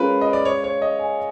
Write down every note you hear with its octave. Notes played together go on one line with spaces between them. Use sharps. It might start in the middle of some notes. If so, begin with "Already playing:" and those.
Already playing: G#3 C#4 F4 A#4 B4
D#5
D5
C#5
C#5
D#5
G#5